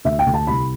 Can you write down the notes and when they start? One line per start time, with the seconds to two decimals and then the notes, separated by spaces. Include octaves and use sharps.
0.05 D2 E5
0.19 G5
0.26 D2
0.34 A5
0.47 C2 B5